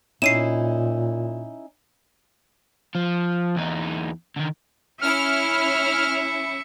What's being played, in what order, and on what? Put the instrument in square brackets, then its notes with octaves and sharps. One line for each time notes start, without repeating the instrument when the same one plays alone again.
[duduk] A#2 [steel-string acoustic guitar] C#4 D#4 E4 [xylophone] C7 D#7 E7
[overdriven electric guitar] F3
E2 D#4
D3 D#3
[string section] C#4 E4 [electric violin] E5 C#7 [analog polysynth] F6